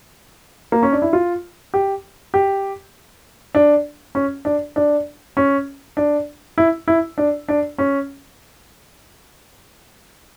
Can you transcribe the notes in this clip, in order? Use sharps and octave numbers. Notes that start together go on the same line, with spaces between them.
A#3
C#4
D4
E4
F4
G4
G4
D4
C#4
D4
D4
C#4
D4
E4
E4
D4
D4
C#4